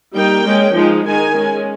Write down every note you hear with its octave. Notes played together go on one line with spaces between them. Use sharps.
G3 A#3 D#4 G5
G#3 C#4
F3 G#3 D#4
D#3 G#3 D#4 G#5
G#3 C#4